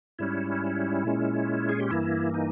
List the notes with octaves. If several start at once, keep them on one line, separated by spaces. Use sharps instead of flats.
G#2 G3 C#4 E4
A#2 G#3 C#4
G#4
G4
G2 E3 A#3 E4
D#4